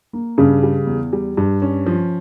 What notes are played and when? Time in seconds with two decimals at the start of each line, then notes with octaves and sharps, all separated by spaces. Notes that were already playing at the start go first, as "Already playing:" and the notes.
0.13 A#3
0.38 G2 C#3
0.63 G3
0.87 E2
1.13 G3
1.37 G2
1.62 C#4
1.86 F3